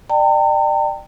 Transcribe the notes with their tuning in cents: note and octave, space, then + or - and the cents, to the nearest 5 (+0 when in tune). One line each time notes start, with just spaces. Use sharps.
D5 +35 G5 +0 A#5 -45